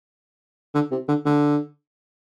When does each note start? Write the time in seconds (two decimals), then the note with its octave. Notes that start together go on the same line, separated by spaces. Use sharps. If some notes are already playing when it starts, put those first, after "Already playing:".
0.74 D3
0.92 C3
1.08 D3
1.26 D3